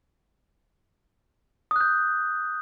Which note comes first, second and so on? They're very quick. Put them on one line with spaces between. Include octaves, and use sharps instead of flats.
D#6 F#6 G6